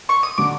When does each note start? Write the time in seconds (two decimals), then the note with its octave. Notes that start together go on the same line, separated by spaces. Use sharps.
0.09 C#6
0.23 D#6
0.38 D3 F#3 D6